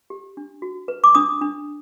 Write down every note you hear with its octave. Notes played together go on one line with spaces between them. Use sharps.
G4
D4
F#4
B4
D6
D4 D#6
D4